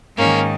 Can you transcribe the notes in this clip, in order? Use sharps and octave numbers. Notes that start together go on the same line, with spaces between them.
G#2 D#3 A#3 C#4